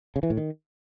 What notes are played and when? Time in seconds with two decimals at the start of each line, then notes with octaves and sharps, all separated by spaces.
0.16 C#3
0.23 E3
0.30 A2
0.37 D#3